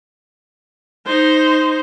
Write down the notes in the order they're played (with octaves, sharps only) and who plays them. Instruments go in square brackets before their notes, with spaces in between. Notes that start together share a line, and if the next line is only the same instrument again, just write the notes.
[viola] D#4 C5